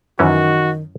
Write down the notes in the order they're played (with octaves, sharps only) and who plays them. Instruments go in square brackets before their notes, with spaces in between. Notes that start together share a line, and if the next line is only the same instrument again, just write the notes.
[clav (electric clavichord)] F#2 E3 C#4 [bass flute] D#3 [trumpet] F#4